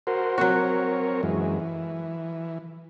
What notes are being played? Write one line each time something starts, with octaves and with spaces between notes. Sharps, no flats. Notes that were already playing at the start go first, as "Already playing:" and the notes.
F#4 A#4 C5
F#3 C4 F#4 A#4 C#5
F#2 E3 G#3
E3